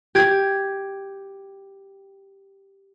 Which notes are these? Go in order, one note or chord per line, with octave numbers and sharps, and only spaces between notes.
G4 G#6